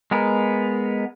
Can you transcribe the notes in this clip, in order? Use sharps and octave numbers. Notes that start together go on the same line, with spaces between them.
G#3 B3 A#4